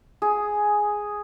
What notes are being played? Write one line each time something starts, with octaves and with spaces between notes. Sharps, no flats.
G#4